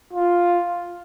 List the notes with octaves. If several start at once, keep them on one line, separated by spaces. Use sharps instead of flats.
F4